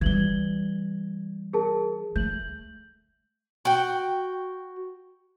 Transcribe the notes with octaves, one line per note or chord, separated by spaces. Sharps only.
E3 G3 G#6 F#7 G7
G#4 A#4 A5
A3 G6 F#7
F#4 G5